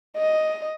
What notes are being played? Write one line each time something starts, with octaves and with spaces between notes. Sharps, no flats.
D#5